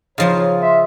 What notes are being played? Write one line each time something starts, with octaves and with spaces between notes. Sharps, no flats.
C#3 F3 F4 A#4 C#5 D#5
E5 C6